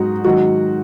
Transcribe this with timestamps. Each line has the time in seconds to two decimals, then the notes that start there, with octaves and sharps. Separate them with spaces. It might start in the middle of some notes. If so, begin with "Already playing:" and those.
Already playing: G#2 F#3 D#4 F#4
0.25 G#2 D#3 F#3 F#4